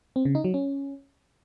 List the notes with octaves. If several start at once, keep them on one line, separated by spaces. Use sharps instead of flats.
C4
C#3
D#4
F#3
C#4